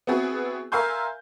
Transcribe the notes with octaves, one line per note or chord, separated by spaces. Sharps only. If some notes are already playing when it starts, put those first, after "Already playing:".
B3 C4 E4 F#4 G#4
A#4 E5 F5 G#5 C6 G6